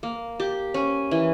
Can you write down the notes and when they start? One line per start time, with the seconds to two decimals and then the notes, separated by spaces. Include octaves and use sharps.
0.03 A#3
0.40 G4
0.74 C#4
1.11 E3